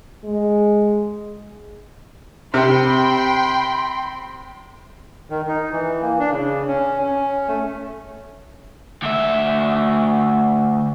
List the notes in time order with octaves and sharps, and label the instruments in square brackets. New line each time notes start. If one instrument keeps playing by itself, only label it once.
[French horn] G#3
[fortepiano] C3 [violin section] G5 B5 C6
[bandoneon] D#3
D#4
E3
A#3
D4
C#3
C#4
C#4
A3
[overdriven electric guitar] D2 E5